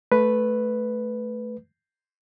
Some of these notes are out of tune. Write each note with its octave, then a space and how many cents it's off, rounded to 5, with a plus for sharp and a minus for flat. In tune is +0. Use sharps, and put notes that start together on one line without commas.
A3 -10 B4 +0